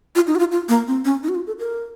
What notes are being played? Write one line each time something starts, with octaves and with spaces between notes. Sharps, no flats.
F4
D#4
F#4
F4
F4
A#3
C4
C#4
D#4
F#4
F4
A4
A#4